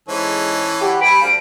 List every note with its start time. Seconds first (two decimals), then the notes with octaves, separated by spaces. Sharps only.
0.08 G#2 E3 C#4 A4
0.81 E4 F#4 G4
1.02 G3 E5 G#5 B5 D7
1.22 D2 D3 F5